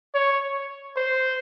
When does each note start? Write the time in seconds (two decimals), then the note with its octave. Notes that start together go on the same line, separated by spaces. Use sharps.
0.15 C#5
0.97 C5